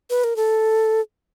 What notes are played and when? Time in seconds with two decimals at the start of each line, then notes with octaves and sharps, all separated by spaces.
0.10 B4
0.24 A#4
0.36 A4